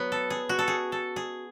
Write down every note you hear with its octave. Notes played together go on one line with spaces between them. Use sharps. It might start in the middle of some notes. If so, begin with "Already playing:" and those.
Already playing: F#3 B3
A4
G#4
F#4
A4
G#4
A4
G#4